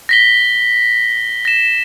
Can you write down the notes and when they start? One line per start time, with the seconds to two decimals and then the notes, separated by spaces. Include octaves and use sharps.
0.09 A#6 B6 G7
1.45 A#6 E7